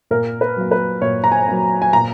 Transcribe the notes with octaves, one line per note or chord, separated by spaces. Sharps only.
A#2 A#4
B4
F#3 A#3
B4
A#2 C#5
A#5
G#5
F#3 A#3
G#5
A#2 A#5